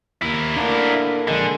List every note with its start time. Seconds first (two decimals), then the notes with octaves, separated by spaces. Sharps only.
0.22 D#2 E4 A#4
0.56 A2 D3 A#3 D4
1.28 A#1 D3 G#3